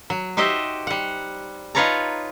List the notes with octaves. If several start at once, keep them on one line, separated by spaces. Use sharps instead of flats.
F#3
D#4 F#4 G4 C5 D#5 E5
G3 F#5
D#4 F4 B4 C#5 A5 A#5